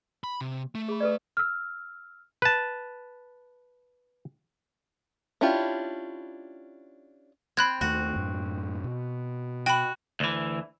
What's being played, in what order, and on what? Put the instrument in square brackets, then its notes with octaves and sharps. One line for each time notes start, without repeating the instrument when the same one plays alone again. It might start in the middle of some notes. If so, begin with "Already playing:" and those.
[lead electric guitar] B5
C3
A3
[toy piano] G#4 B5
A4 B4 D5
[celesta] E6 F6
[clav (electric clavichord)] B4 A5
[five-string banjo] C#4 D4 E4 F4 G4
[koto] C4 [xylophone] B5 F#6 G#6
[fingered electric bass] D#2 D#3 A3 [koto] F#4
[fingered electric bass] F#2 A2
B2
[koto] F#4 [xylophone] G5 B5
[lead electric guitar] D2 E3